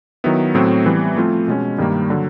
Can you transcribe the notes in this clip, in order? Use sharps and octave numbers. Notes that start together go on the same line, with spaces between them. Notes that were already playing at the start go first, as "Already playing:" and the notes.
D#3 F#3 B3 E4
A2 F#3 A3 C4
E3 G3 B3
F3 A3 C4 F4
B2 G#3 C#4
G2 D#3 G3 A#3
D3 F#3